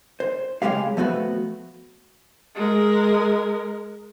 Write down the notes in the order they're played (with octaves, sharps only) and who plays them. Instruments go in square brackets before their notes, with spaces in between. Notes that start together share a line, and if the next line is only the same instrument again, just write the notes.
[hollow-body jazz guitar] C5
C#3 F#3 G#3 G4 F5
F3 A3 B3 F#4
[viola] G#3 A#4